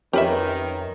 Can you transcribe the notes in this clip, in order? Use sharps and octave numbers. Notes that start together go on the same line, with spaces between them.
F2 D#3 C#4 G4 A#4 B4 E5